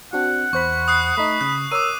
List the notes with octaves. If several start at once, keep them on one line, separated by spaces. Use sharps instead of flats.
C4 D4 F#4 F#5
E2 C5 B5 C#6
D#6 F#6 C7
A3 D#4 B5
C#3 F#6
A#4 C#5 D6 E6 D#7